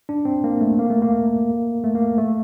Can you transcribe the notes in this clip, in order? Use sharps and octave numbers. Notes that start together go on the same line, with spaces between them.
D4
C4
A#3
A3
A#3
A3
A#3
A3
A#3
A3